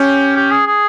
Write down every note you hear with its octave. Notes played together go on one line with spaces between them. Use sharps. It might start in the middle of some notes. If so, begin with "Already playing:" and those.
Already playing: C#4 G4
G4
G#4
G#4